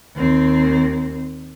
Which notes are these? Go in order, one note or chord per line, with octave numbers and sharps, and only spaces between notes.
D#2 C4